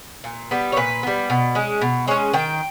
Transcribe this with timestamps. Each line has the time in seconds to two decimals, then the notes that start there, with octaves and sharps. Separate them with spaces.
0.24 A#2
0.51 G3 B3
0.72 C#5
0.76 A#2 B4
1.03 G3 B3
1.30 B2
1.55 G#3 C#4
1.81 B2
2.07 G#3 C#5
2.11 C#4
2.33 D#3 G5